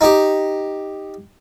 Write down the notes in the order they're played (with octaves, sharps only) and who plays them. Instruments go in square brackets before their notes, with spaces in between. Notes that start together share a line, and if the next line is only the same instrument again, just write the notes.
[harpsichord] D#4 G4